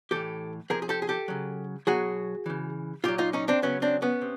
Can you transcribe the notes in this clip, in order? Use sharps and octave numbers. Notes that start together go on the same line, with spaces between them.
A2 E3 G4 A4
C3 F3 G#4 A#4
G#4
G4 A4
G#4
G4 A4
C#3 F#3
B2 F#3 F#4 G#4
C#3 E3
A#2 F#3 F4 G4
D#4 F4
C#4 D#4
C4 D4
C#3 F#3 B3 C#4
C4 D4
B3 C#4
C3